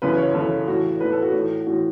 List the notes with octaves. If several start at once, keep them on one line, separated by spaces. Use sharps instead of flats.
F#2 C#3 E3 B4
C#5
F#2 C#3 E3 A4
A2 E3 F#4
A2 E3 B4
A4
F#4
A2 E3
A2 E3 F#4